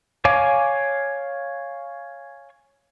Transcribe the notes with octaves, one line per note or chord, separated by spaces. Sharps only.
C#5 F5 G#5 D6